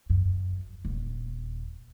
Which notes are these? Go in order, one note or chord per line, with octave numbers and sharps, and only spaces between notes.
F#2
D#1